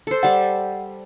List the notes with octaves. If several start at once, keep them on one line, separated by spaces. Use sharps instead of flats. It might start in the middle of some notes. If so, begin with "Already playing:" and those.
A4 C5
G3 F#5 A5